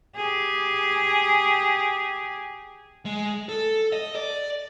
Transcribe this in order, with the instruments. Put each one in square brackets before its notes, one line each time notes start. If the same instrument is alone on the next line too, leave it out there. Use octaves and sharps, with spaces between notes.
[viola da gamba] G4 G#4
[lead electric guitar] G#3
A4
D#5
D5